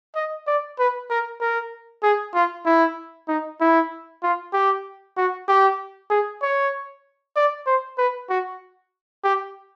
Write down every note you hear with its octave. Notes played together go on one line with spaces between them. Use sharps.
D#5
D5
B4
A#4
A#4
G#4
F4
E4
D#4
E4
F4
G4
F#4
G4
G#4
C#5
D5
C5
B4
F#4
G4